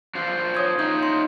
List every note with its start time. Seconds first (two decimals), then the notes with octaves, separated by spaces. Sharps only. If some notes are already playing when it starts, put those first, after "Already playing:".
0.15 D4 F4 C5
0.55 C#5 D#6 G#6
0.79 D#4 F4 E5 G6
1.03 C6